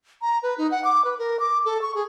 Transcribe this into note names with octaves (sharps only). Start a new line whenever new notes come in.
A#5
B4
D#4
F#5
D6
B4
A#4
D6
A4
C#6
G#4